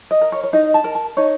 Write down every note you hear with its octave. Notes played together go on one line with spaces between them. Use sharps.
D#5
A#4
C#5
C#5
D#4 D#5
A5
A#4
A5
D#4 C#5